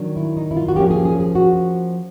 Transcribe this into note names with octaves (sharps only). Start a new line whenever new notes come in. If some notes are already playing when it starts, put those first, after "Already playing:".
Already playing: D#3 F#3 A#3 D4
E4
D#4
E4
F4
F#4
F3 A#3 C#4 G4
G#4
G#4
G#4
F#4